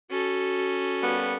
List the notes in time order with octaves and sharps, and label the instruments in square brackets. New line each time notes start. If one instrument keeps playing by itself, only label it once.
[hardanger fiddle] C#4 A4 [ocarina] F#4
[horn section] G3 A#3 B3